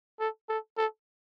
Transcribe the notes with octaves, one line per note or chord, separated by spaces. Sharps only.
A4
A4
A4